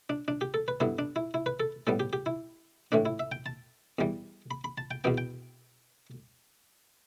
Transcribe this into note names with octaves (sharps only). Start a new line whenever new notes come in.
D4
D4
G4
A4
B4
G2 D3 B3 E4
D4
E4
E4
B4
A4
A2 G3 B3 A4
G4
G4
E4
A2 E3 A3 D4
E4
E5
G5
A5
E2 E3 G3
B5
B5
A5
G5
E2 B2 B3 G5
G5